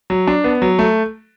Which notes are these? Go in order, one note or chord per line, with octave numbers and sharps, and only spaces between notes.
F#3
D4
B3
F#3
A3